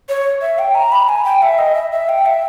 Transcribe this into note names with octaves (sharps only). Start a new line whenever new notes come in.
C#5
E5
G5
A#5
B5
G#5
G5
E5
D#5
E5
E5
G5
E5